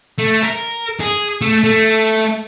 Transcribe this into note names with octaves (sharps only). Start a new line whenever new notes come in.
A3
A#4
G#4
A3
A3